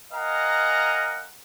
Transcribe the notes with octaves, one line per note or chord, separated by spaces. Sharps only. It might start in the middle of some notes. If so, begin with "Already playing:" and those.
A#4 D#5 F5 F#5 G#5 A#5